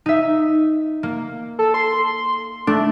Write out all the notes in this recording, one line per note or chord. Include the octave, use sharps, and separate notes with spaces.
D#4 E5
A#3
A4
C6
A3 D4